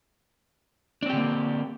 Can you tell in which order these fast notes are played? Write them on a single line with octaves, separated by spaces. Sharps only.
D4 C4 G4 D3 A#3